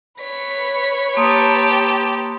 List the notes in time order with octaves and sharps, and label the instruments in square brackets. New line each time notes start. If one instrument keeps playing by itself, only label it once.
[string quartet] B4 C#5 [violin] B6
[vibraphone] A#3 C6 D#6 [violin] G4 A5